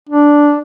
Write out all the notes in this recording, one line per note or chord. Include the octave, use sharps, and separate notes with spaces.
D4